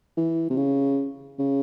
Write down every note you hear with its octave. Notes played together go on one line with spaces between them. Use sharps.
E3
C3
C#3
C#3